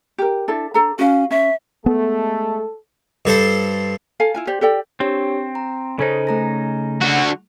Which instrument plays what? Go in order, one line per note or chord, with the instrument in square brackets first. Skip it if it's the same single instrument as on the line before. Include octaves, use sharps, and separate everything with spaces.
[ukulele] G4 A#4
D4 E4 A4
D4 A4 A#5
[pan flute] C#4 [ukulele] F#4 F5
[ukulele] C#4 [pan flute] E5
[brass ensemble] G#3 A3 [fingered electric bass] B3 [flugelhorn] A4
[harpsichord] G2 A4 C5
[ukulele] A4 F5 G#5
E4 F4 G#5
G4 C5 D5
G4 A4 D5 G5
[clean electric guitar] C4 [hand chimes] D4 G4 C#5
[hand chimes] A#5
[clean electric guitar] C#3 C#4 D#4 [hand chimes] A4 C5
[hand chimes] A3 A#5 A#6
[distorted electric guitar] D3 F#4